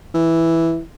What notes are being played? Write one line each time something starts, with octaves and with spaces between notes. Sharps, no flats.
E3